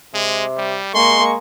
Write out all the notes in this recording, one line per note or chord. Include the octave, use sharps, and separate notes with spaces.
C3 G#3
G3
G#3 A#3 C6 C#6